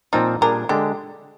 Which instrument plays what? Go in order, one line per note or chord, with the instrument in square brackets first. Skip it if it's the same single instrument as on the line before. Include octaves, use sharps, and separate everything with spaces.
[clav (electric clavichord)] A#2 F3 C4 F4 [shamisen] D#4
[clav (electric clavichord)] A#2 G3 D4 G#4 [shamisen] A#4
[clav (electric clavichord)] D3 G#3 D4 [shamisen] G4